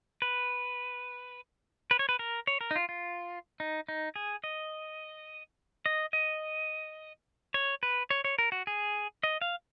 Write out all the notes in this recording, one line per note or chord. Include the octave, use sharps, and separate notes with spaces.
B4
B4
C#5
B4
A#4
C#5
A#4
D#4
F4
F4
D#4
D#4
G#4
D#5
D#5
D#5
C#5
B4
C#5
C#5
A#4
F#4
G#4
D#5
F5